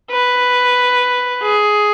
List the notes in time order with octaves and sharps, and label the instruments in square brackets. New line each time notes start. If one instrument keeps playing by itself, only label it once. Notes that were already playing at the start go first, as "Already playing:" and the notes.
[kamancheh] B4
G#4